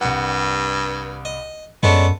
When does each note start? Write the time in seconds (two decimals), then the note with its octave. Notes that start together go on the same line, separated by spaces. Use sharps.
0.01 C2 G2 F#5
1.25 D#5
1.83 F#2 G#3 B3 C#4 D4 A4 A5